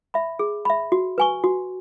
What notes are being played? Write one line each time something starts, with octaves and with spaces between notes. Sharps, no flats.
E5 B5
G#4
E5 B5
F#4
B4 G#5 C#6
F#4